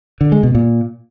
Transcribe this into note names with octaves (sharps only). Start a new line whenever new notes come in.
D3
G#3
B2
A#2